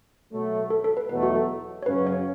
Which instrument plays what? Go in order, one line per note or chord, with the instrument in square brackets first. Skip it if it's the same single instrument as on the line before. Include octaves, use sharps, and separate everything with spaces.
[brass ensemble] B2 F#3 A3
[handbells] A4
A4
B4
[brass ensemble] E2 B2 F#3 A3 [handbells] B4
[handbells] F#4
A4
C#5
[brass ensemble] F#2 C#3 F#3 C#4 [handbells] B4
[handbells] C#5